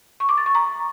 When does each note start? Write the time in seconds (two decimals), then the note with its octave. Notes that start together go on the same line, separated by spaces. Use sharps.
0.20 C#6
0.29 D6
0.37 A6
0.46 C#6
0.55 A#5